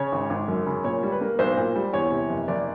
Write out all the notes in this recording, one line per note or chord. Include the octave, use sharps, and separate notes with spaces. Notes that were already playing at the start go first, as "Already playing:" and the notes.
Already playing: C#3 C#5
G#1
G#1
F#2
C#3
A#2 C#5
G3
B4
A#3
B1 C5
A#2
G3
E2 C#5
C3
F#1
F#1 D5